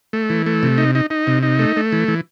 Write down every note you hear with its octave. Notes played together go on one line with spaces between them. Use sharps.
A3
E3
A3
C3
D#4
D#4
D#4
C3
D#4
A3
A3
E3
E3